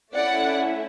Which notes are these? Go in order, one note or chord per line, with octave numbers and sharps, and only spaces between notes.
A3 C#4 E4 D5 F#5